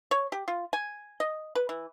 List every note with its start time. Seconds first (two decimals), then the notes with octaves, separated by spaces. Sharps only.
0.11 C#5
0.32 G4
0.48 F4
0.73 G#5
1.20 D#5
1.55 B4
1.69 E3